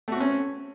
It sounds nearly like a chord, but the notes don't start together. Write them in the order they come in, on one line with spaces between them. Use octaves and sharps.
A3 F#4 C4 C#4